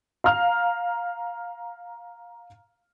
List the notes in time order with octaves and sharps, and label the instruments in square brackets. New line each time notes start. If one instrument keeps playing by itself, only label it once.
[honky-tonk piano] F5 A#5 F6